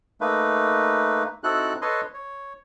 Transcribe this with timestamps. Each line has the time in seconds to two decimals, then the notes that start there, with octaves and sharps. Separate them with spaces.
0.21 A3 A#3 D#4 B4
1.44 C4 D#4 E4 F#4 A4 F#6
1.82 A4 B4 C#5 D#5 C6
2.13 C#5